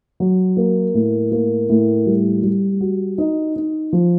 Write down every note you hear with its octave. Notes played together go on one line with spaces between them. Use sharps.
F#3
A#3
A2
A#3
A2
G3
G3
F#4
D#4
D#4
F3